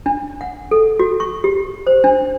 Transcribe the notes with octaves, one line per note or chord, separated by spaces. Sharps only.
D4
F#5
A4
F#4
C#6
G4
C5
D4